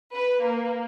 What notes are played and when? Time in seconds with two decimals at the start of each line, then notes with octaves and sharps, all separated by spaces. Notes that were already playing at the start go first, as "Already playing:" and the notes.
0.15 B4
0.45 A#3